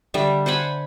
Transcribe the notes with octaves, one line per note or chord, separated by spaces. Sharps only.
D3 G3 E5
C5 F#5 G#5 B5